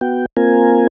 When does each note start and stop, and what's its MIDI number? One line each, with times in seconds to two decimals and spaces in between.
0.01 0.26 59
0.01 0.26 66
0.01 0.26 79
0.37 0.87 58
0.37 0.87 60
0.37 0.87 65
0.37 0.87 70
0.37 0.87 80